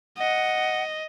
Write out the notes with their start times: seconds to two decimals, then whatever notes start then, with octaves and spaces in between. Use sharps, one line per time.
0.18 D#5 F#5